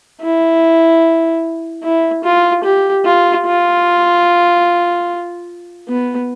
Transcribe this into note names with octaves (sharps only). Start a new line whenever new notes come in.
E4
E4
F4
G4
F4
F4
B3